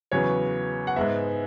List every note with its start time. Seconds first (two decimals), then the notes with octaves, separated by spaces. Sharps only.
0.12 E2 C#3 F#3 B3 C#5
0.87 F#5
0.96 G#2 G#3 B3 E5